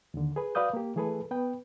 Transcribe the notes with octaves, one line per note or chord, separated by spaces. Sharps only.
D#2 D3
G#4 B4
F#4 B4 D5 F5 D#6 G6
A#3 G4
E3 A3 G#4 A4 B4
B3 B4 G5